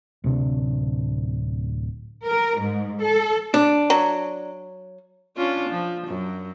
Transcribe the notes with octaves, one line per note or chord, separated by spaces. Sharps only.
D1 C3 D4
A#4
G#2
A4
D4
F#3
C#4 D4 F4
F3
F#2